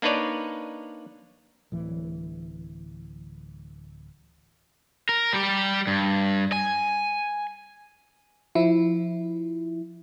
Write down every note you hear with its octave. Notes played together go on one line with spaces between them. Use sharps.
A#3 D4 D#4 B4 C#5 D5
D1 E3
A#4
G3 G4
G2
G#5
F3 E4